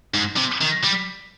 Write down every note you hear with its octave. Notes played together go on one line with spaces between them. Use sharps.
G#2
C3
D#3
G3